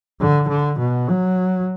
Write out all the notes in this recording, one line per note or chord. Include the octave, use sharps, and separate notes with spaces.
D3
D3
B2
F#3